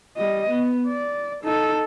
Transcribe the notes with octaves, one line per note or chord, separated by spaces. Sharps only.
G3 D#5
B3
D5
D#4 A4